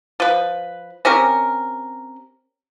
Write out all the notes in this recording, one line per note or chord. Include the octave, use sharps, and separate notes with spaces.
F3 B4
C4 C#4 G4 A#4